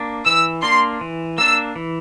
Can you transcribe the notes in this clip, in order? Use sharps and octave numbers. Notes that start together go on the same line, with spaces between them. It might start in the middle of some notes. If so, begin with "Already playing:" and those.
Already playing: A#3 D4
E3 E6
A#3 D4 C6
E3
A#3 D4 E6
E3